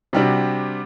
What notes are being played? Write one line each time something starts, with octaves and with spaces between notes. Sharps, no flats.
C3 G3 D4 F#4